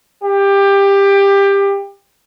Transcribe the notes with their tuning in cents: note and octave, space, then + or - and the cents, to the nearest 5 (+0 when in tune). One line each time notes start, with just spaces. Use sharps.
G4 +20